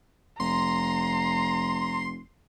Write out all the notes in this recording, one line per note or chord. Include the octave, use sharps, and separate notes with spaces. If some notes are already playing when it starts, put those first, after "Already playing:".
F1 A#5 C6